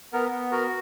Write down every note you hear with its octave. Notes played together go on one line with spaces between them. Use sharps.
B3 A#4
B3
F#4 A#4